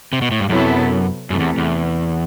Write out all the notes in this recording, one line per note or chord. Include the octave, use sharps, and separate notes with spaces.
C3
B2
A2
G2
F#2 C3 F#3 B3 E4 A4
F#2 C3 E3 A3
E2
E2